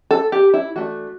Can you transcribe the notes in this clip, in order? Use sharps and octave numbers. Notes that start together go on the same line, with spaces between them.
A4
G4
E4
E3 A3 D4 F#4